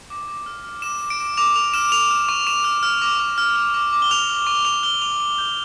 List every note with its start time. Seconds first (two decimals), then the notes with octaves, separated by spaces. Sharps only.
0.10 D6
0.28 D6
0.46 F6
0.64 F6
0.82 D6 E7
1.02 D6
1.10 D7
1.19 D6
1.37 D6 F7
1.56 F6 F7
1.73 F6 E7
1.92 C#6 F7
2.10 F6
2.29 C#6
2.47 C#6 E7
2.64 F6
2.83 F6
3.02 D6
3.20 F6
3.38 F6
3.56 F6
3.74 D6
3.93 D6
4.02 G7
4.11 F6 F7
4.30 F6
4.47 C#6
4.65 C#6 F7
4.83 F6 G7
5.02 C#6 F7
5.20 C#6
5.38 G6